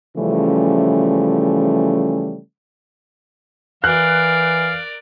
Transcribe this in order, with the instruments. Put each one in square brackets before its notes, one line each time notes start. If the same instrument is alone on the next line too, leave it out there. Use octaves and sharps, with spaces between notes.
[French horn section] C#3 E3 F3 G3 A3 C#4
[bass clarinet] E3 [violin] A#4 D5 [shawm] F5 [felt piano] F#6